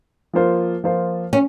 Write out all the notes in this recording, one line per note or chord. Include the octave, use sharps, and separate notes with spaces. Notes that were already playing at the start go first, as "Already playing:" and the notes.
F3 A#3 F4 C5
F3 A#3 F4 C5
C#4